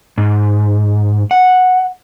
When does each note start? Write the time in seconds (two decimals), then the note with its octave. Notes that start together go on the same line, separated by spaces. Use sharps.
0.18 G#2
1.31 F#5